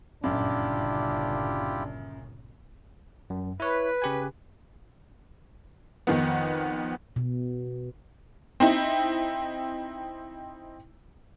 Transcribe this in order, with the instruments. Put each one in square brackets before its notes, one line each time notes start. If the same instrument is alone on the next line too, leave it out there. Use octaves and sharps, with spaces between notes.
[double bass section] G1 A#2 C#3 [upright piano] F#2 [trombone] D4 [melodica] E4 F4 G4
[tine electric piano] F#2
[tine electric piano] E4 C#5 [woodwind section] B4
[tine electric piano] C#3 G4 G#5
[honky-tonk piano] F2 D#3 B3
[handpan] B2
[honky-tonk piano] C4 D#4 E4